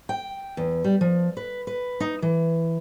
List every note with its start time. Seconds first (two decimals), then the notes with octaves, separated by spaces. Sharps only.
0.09 G5
0.57 E2
0.84 G3
1.01 F3
1.37 B4
1.67 B4
2.00 D#4
2.22 E3